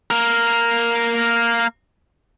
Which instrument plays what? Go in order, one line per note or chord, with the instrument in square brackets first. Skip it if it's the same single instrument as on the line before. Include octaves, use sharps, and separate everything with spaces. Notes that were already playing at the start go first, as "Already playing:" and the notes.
[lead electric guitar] A#3 A#4